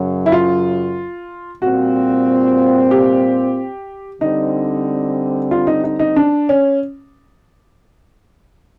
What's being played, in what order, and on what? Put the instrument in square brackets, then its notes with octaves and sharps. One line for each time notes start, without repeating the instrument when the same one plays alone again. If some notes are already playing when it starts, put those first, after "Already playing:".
Already playing: [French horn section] F#2 C#3 F#3
[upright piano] E4
F4
[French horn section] A#2 G3 C4 F4 [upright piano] F#4
[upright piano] G4
[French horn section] D3 G3 C4 [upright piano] D#4
[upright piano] F4
D#4
D#4
D#4
D4
C#4